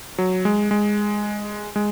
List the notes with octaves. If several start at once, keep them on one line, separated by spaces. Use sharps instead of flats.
F#3
G#3
G#3
G#3